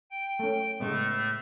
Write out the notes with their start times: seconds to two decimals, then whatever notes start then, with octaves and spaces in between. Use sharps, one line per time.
0.11 G5
0.39 A3 C#4
0.80 A2 C#3 G#3 A3 B3